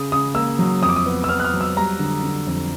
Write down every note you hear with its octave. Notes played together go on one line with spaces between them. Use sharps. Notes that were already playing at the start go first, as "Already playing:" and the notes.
Already playing: C#3 D#6
C#3 D#6
A#3 E6
F#3
F2 D#6
D6
D#6
B3
E6
B3 F6
F#6
F6
F#3
E6
G3 A#5
D3
D3
F2